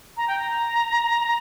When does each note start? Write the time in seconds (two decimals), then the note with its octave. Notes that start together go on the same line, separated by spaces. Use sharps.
0.17 A#5
0.28 G5
0.39 A#5